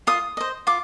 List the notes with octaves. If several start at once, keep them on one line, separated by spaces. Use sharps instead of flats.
F4 D#6
C5 D#5
F4 D6